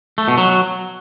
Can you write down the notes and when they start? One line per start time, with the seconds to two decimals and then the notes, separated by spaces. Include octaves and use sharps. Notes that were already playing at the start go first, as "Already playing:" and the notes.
0.18 A3
0.28 B2
0.38 F#3